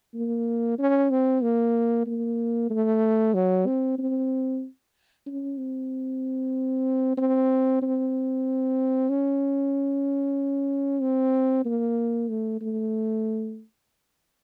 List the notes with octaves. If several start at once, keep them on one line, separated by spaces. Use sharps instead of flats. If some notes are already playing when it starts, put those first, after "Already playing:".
A#3
C#4
C4
A#3
A#3
A3
F#3
C4
C4
C#4
C4
C4
C4
C#4
C4
A#3
A3
A3